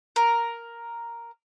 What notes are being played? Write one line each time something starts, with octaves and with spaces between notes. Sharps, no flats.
A#4